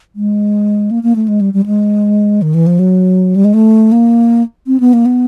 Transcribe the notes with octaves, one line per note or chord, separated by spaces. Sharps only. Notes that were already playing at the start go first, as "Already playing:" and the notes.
G#3
A#3
A#3
A3
G#3
G3
G3
G#3
D#3
E3
F3
F#3
G3
G#3
A3
A#3
C4
B3
A#3
B3